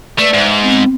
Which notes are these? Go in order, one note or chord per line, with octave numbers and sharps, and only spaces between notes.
A3 B4 D5
G#2 E5
B3 C4